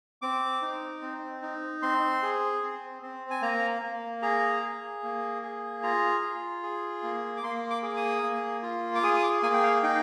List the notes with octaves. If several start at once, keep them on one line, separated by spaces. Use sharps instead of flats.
C4 D6
D#4
C4
D#4
C4 C6
G#4
C4
C4
G#5
A#3 A#5
A#3
G#4 A#5
G#4
A#3
G#4
F4 A#5
F4
G#4
A#3
D6
A#3 C6
D6
G#4
D#6
A#3
F4
D6
G#4 D#6
D#6
D6
A#3 G#5
G5
F5
D#4 G5